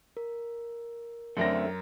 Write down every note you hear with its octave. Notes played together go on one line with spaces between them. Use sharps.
A#4
F#2 D3 A3 C4 A#4 A#6